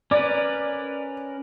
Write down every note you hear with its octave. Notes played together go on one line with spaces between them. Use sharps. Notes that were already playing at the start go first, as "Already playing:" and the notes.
C#4 A#4 B4 D5